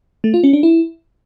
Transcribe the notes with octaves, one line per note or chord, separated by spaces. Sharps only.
A3
F4
C#4
D4
E4